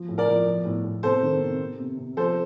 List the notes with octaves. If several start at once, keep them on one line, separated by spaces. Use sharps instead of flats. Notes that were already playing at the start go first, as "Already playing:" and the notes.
Already playing: F3
A2
A#4 D5
F3
F3
A2
A2
C3 A4 C5
D#3
C3
C3
C3
C3
F3 A4 C5